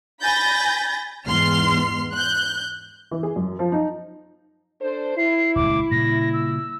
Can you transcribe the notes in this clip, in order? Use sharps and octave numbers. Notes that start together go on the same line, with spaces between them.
G#5 B5 G6 A6 A#6
E2 G#2 C6 F6 C7
F#6 G6
E3
G#4
F#2
F3
D#4
D4 A4 C5
E4 C7
D#1 C#2 D6
A#2 C#3 G3 A#6
E6